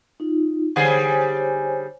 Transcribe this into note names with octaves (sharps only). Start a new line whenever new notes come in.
D#4 F4
D3 G3 G#4 C5 C#5 G#5